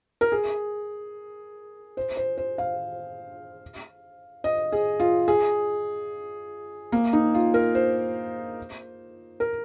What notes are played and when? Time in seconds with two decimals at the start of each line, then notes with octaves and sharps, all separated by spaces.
0.21 A#4
0.32 G#4
1.97 C5
2.17 C5
2.38 C5
2.58 F5
4.44 D#5
4.72 G#4
5.00 F4
5.28 G#4
6.92 A#3
7.13 D#4
7.34 F4
7.54 A#4
7.75 C5
9.40 A#4